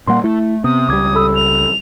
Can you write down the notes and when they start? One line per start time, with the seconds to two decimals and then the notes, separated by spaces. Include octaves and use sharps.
0.07 A#2 G3 A#3 F#5 C6
0.24 A3 E4
0.64 C3 B3 D#6
0.89 C#2 G3 D6 G#6
1.15 A4 B5 E6
1.35 F7